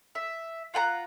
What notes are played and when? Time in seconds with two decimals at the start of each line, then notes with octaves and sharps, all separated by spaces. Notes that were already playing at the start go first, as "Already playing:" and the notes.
0.15 E5
0.74 F4 F#5 G#5 A#5